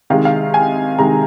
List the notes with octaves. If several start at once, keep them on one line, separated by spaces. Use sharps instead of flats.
C3 D#3 G#3 F5
F5
G#5
C3 D#3 G#3 A#5